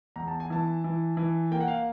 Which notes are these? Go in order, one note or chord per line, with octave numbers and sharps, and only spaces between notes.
E2 A#5
A5
G#5
E3 A5
E3
E3
A#3 G5
F#5
F5